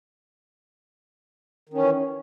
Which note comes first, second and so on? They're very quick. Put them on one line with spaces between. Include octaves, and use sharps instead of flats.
D#3 C#4 E3